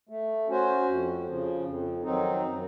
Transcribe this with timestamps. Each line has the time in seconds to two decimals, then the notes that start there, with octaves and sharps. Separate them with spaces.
0.09 A3
0.48 C#4 F#4 C5
0.87 F2
1.25 C#3 F3
1.64 F2
2.02 D#3 F#3 C4 D#4
2.42 F#2